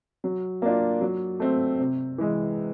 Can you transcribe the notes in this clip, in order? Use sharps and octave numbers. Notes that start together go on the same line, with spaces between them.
F#3
A#3 D4 F4
F#3
A3 C4
C3
E3 G#3